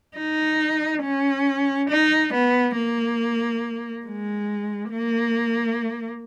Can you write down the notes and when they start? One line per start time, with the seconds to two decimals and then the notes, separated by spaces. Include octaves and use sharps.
0.17 D#4
1.03 C#4
1.90 D#4
2.33 B3
2.76 A#3
4.05 G#3
4.92 A#3